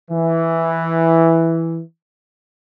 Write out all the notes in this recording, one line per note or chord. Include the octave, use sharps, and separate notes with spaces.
E3